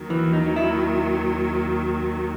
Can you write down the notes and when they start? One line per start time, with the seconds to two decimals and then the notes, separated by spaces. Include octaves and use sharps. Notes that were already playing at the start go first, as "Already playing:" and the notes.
Already playing: D#2 D#3 F#3
0.10 E3
0.33 D#4
0.56 E4